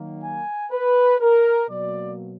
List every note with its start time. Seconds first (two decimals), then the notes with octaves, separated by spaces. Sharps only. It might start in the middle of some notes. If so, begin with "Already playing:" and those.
Already playing: D#3 F#3 A#3
0.23 G#5
0.72 B4
1.20 A#4
1.69 B2 F#3 A#3 D5